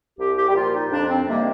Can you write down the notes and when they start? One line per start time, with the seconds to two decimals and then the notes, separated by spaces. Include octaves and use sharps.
0.18 C2 G4
0.36 G4
0.48 G4
0.54 A#2 F3 F4
0.72 D#4
0.91 F2 D4
1.09 C4
1.27 C3 D#3 G3 A#3